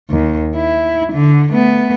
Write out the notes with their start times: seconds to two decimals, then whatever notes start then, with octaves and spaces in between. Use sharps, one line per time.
0.10 D#2
0.56 E4
1.13 D3
1.53 A3 B3